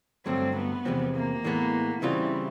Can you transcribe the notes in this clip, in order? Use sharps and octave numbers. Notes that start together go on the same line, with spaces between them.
G2 D3 F#3 A3 C4
B3
E2 C3 F3 G#3 C4
A#3
A2 E3 G#3 B3
C#3 E3 G3 C4 E4 F4